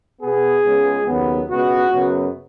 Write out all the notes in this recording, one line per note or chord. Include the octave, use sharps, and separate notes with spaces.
B2 B3 G#4
C#2 C#3 G#3 B3
D#2 C#3 F#3 B3
C#2 B2 B3 F#4
F#2 C#3 F#3 B3